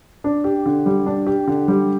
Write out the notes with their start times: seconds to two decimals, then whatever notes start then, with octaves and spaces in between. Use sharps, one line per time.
0.24 D4
0.44 G4
0.66 D3
0.86 G3
1.06 D4
1.27 G4
1.47 D3
1.68 G3